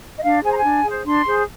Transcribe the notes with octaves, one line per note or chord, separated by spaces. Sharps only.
D#5
D4 F5
G#4 C5 G#5
A#5
G#5
D4
G#4 C5
D4 C6
G#4 C5